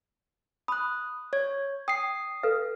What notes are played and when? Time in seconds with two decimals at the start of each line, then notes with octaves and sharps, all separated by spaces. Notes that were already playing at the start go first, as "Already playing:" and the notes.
0.68 B5 D#6 F#6
1.33 C#5 G#6
1.88 G5 D#6 C7
2.43 A4 B4 F5